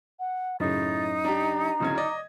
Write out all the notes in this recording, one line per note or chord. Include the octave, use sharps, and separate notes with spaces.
F#5
F#2 A2 C#3 D#4 A6
D4 G4 A#5
D1 C#3 G#6
D5 D#5